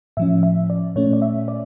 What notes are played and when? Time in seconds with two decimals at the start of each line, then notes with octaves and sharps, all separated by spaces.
0.17 A2 F3 C#4 E5
0.43 E5
0.70 D5
0.96 A#2 A3 C#4 C#5
1.13 D5
1.22 E5
1.48 D5